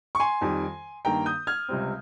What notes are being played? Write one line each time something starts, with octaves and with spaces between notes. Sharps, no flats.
C#6
G#5 C6
F2 D#3 G3
G2 D#3 A#3 G5 A#5
D#6 G6
F6 G#6
C#2 C3 G3 C4